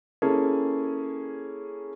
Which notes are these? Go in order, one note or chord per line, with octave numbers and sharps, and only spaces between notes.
A#3 C#4 E4 G#4 A4